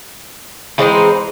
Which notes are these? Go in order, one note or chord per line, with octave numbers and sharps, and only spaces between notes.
E3 G#3 C4 D#4